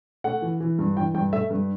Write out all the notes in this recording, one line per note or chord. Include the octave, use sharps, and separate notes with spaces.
A3 F#5
E3
E3
G2
E3 G5
G2 G5
A3 E5
G2